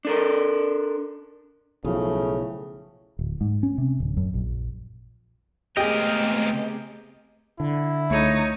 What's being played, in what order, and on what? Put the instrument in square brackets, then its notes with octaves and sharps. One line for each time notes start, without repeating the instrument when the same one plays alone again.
[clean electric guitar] D4 A4 A#4
[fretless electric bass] B1 [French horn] A2 [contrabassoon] C#3 [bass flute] F3
[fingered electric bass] D1
G#2
C#4
C3
D1
F#2
A#1
[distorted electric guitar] C#2 A#4 [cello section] A3 B3 C4 [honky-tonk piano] G4 G#4 [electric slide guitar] D#5
[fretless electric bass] D3 [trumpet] E4
[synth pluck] C#2 A3 [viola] D#4 C#5